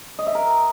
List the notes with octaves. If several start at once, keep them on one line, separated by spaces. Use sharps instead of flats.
D#5
E5
A#4